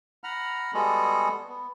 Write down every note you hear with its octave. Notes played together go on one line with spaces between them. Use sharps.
F#5 A#5 B5 F6
G3 G#3 B3 F#4 G#4 A4
B3